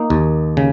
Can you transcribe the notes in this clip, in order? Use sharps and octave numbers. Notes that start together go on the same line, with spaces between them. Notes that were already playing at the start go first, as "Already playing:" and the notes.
Already playing: A#3 D#4
D#2
C#3